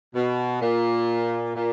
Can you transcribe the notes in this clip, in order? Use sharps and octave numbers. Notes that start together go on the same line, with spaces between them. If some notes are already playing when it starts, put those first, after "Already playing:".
B2
A#2
A#2